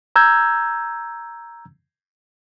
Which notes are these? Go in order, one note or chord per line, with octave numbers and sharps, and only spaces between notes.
A#5 E6 G6 G#6